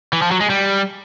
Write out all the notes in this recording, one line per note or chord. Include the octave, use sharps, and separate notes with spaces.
E3
F3
F#3
G#3
G3